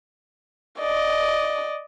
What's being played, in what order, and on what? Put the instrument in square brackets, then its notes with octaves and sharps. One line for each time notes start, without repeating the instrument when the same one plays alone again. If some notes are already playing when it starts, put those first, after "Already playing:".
[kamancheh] D5 D#5